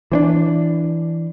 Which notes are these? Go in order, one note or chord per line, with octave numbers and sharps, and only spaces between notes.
E3 C4 D4